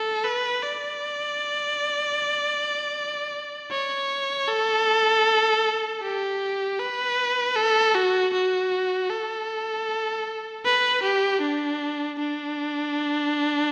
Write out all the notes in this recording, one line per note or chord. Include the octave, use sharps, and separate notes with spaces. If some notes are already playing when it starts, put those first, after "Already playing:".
Already playing: A4
B4
D5
C#5
A4
G4
B4
A4
F#4
F#4
A4
B4
G4
D4
D4